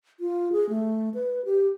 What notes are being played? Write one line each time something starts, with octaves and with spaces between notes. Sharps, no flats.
F4
G#4
A3
B4
G4